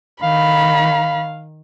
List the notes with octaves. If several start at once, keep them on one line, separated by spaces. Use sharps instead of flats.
D#3 F5 B5